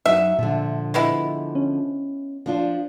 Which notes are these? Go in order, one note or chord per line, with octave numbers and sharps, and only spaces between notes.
F#2 F#3 D#4 E5
A#2 D3 F3
G#3 B3 E4
C#4
F3 D4 F4